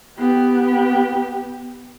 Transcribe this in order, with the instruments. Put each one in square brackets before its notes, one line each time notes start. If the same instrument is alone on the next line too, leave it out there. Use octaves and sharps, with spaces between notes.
[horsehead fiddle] B3 G4